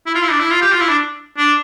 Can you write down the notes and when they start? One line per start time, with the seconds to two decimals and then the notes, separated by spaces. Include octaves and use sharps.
0.07 E4
0.15 F4
0.23 E4
0.31 D4
0.40 E4
0.51 F4
0.61 G4
0.73 F4
0.80 E4
0.89 D4
1.38 D4